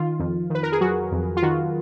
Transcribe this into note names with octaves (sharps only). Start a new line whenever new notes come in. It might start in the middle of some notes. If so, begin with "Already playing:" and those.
Already playing: D#3 F4
F2
D#3 B4
A#4
G#4
F#3 F#4
F2
F4
D#3 F#4